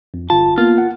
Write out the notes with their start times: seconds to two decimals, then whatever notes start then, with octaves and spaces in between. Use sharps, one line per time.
0.14 F2
0.30 G1 F4 A5
0.58 A#3 B3 F4
0.78 F#5